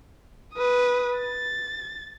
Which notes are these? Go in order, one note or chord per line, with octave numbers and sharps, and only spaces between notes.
B4 D#6
A6